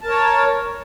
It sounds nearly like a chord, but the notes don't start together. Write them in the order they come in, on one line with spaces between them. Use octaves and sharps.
A5 A#4 C#5